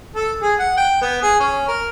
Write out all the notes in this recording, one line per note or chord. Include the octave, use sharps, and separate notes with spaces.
A4
G#4
F#5
G5
B3
G#4
C#4
A#4